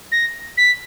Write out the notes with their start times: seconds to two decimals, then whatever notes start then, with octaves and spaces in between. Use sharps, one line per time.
0.12 A#6
0.57 B6